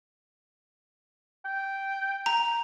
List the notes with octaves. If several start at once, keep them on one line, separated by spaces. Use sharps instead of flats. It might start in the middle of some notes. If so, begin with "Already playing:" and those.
G5
A#5